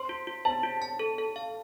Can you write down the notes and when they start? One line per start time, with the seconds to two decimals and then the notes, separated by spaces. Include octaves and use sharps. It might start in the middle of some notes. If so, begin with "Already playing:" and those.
Already playing: C5 C6
0.09 F4
0.27 F4
0.45 C5 A5
0.63 F4
0.82 A5
0.99 A4
1.18 A4
1.36 F5